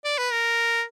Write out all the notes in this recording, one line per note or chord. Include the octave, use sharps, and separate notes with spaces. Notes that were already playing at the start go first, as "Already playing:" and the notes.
D5
B4
A#4